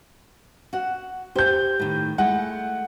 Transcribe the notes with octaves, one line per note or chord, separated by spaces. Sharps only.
F#4 F#5
G4 C5 G6
A2 D#3
G#3 A3 E4 F#5